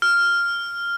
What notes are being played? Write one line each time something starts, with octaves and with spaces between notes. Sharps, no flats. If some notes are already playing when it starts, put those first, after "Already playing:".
F6